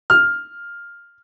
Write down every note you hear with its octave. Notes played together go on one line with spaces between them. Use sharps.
F6